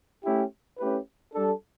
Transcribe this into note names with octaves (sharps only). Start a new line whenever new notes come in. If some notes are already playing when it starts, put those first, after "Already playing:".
A3 C#4 E4 G4
A3 C#4 E4 G4 B4
G3 D4 A4